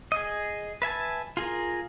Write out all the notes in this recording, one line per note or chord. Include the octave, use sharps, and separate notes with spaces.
G#4 D#5
B4 E5 G#5 A5
F4 G#4 A#4